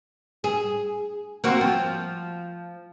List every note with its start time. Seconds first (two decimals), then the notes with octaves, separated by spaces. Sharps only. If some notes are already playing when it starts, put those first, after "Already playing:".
0.44 G#4
1.44 A#3 C4 F#4
1.61 F3